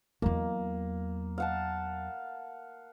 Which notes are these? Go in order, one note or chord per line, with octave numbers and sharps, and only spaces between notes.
E2 F#3 A#3
F5 F#5 A5